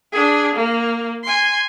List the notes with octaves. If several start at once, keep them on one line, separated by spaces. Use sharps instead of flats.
D4 G#4
A#3
G#5 C6